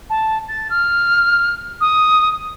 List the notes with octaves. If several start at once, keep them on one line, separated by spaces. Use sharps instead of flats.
A5
A6
F6
D#6